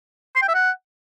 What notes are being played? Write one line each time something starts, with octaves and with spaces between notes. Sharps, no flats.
C6
G5
E5
F#5